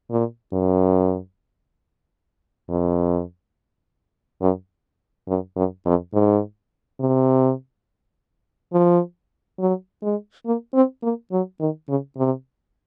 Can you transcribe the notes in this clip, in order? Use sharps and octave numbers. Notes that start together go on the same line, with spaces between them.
A#2
F#2
F2
F#2
F#2
F#2
F2
G#2
C3
F3
F#3
G#3
A#3
C4
A#3
F#3
D#3
C#3
C3